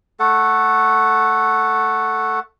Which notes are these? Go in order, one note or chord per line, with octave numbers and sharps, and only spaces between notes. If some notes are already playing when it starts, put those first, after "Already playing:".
A3 A4 F#5